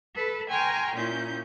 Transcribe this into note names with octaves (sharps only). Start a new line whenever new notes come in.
A4 B4 B5
G5 G#5 A#5 C6 C#6 F6
A#2 C#4 E4 G6